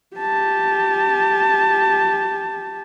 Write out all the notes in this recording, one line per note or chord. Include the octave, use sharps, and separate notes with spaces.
G4 A5